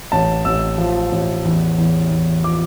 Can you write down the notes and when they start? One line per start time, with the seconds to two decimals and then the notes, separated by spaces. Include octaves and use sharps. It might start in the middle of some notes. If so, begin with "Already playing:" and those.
0.12 A1 A5
0.45 A1 E6
0.78 F3
1.12 A1
1.45 E2
1.78 E2
2.11 E2
2.43 F3 D6